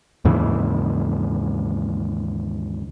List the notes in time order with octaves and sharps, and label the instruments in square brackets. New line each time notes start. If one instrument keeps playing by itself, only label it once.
[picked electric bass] D#2 G#2 C#3 E3